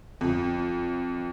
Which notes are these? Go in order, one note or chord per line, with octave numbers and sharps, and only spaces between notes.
F2